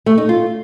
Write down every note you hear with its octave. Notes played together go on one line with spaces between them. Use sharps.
A3
D#4
F4